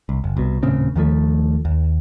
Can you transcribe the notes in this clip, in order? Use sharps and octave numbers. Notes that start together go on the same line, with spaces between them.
C2
F#1
C2 B2
D#1 A2 C#3 C4
D#2 D#3 F3 A3
D#2